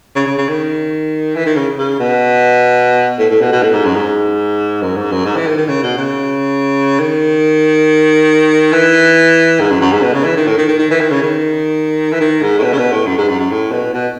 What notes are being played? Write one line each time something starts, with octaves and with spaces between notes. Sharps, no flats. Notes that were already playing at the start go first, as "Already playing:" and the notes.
C#3
C#3
C#3
D#3
E3
D#3
C#3
C#3
B2
A2
A2
B2
B2
A2
G#2
F#2
G#2
F#2
G#2
F#2
G#2
E3
D#3
D#3
C#3
B2
C#3
D#3
E3
G#2
F#2
F#2
G#2
B2
C#3
E3
D#3
A2
D#3
D#3
D#3
E3
D#3
C#3
D#3
E3
D#3
G#2
A2
B2
C#3
B2
A2
F#2
G#2
F#2
F#2
A2
B2
B2